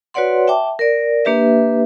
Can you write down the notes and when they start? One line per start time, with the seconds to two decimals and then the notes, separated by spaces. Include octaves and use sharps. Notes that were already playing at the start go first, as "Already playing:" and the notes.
0.14 F#4 B4 C#5 D5 F#5 C6
0.47 E5 G5 A5 D6
0.79 A#4 D5
1.25 A#3 D4 G4 B4 E5